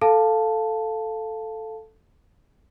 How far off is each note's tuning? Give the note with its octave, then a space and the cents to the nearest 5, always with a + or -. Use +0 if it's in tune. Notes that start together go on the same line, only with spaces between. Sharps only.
A4 +0 F5 +0 A5 +0